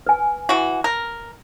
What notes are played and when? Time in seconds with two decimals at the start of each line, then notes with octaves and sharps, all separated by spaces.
0.07 B4 G#5
0.49 E3 F#4
0.84 A#4